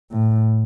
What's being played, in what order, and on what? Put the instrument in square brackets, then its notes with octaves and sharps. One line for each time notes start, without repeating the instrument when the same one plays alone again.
[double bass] A2